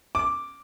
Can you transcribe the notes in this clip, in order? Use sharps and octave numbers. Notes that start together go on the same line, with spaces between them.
D6